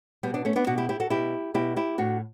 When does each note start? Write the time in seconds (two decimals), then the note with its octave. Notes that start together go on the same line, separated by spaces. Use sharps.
0.23 B2 G3 B3
0.34 B3 D4
0.45 A3 C#4
0.56 B3 D4
0.67 B2 D4 F#4
0.78 E4 G4
0.89 E4 G4
1.00 F#4 A4
1.10 B2 E4 G4
1.54 B2 E4 G4
1.76 E4 G4
1.98 A2 D4 F#4